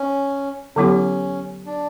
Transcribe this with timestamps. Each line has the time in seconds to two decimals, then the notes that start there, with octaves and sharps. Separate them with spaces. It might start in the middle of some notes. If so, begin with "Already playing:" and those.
Already playing: C#4
0.76 D3 F#3 B3 C#4 E4 G4
1.66 D4